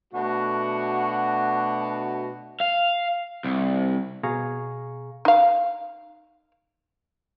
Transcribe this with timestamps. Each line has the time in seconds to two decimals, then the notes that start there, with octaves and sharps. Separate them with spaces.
0.13 B2 A3 D4 F#4
2.61 F5
3.44 C2
4.23 B2 G#4 F5 A#5 C#6
5.25 D#4 F5